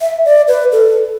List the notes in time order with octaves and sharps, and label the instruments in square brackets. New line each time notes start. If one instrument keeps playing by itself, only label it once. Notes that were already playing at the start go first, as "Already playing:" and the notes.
[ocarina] E5
D5
B4
A4